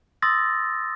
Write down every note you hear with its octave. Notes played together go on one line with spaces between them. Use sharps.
C6 D#6 E6 A6 A#6